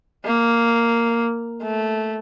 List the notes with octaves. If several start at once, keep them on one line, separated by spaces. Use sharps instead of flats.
A#3
A3